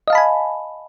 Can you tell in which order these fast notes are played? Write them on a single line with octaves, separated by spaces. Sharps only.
D#5 F5 A5 B5 G#5